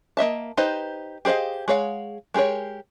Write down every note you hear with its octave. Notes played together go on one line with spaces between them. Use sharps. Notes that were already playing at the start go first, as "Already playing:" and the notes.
A#3 D#5 E5 A5
D#4 G4 B4 C5 D#5
G4 G#4 C5 D#5 F5
G#3 G#4 C#5 F5 F#5
G#3 G4 G#4 A#4 C#5